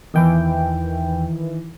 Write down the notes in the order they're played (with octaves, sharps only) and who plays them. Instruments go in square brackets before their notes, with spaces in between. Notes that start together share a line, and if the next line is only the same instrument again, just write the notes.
[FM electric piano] E2 G5 [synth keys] D#3 E3